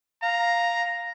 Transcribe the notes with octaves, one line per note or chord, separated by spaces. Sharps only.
F5 A#5